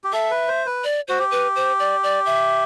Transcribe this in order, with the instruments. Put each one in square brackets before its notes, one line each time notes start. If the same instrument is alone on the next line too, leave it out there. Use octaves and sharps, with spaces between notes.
[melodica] G4
[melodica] A4 [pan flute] E5
[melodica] B4
C5
B4
[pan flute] D5
[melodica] F#4 [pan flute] C5
[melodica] G4
[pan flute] B4
C5
D5
D5
E5